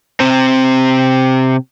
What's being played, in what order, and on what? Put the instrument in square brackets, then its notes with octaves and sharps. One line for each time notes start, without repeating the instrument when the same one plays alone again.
[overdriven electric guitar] C3 C4